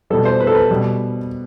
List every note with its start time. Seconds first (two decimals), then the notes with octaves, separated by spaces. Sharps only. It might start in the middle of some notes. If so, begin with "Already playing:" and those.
0.10 B2 G3 A4
0.25 C5
0.40 B4
0.47 A4
0.55 B4
0.70 B2 G3